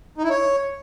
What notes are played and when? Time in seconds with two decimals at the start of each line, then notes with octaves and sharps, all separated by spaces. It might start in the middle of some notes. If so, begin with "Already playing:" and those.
0.18 D#4
0.24 E4
0.30 C#5